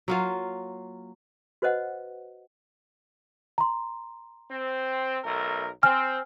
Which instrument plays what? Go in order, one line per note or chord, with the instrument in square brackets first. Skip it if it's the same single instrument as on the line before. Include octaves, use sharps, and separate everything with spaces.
[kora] F#3 A#3 F4
[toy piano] F#4 B4 C5 D#5 F#5
[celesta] A#5 C6
[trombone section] C4
B1 A3 A#4
[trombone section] C4 [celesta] G#5 F6